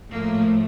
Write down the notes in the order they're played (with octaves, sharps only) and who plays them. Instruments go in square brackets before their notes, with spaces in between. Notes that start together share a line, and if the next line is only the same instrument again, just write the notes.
[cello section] A2 F3 A3 A#3